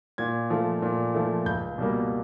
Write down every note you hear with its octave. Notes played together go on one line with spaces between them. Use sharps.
A#2 G#6
F3 A3
A#2
F3 A3
C#2 G6
B2 G3 A#3